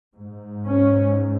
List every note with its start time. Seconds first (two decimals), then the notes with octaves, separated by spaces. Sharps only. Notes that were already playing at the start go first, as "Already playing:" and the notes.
0.16 G#2
0.66 C#4